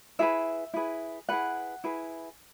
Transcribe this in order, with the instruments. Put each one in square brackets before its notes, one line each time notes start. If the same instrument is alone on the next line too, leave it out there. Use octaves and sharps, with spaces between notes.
[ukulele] E4 G#4 B4 E5
E4 G#4 B4
E4 G#4 B4 F#5
E4 G#4 B4